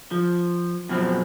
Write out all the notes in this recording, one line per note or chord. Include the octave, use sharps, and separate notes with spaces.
F3
F#2 B2 F3 C4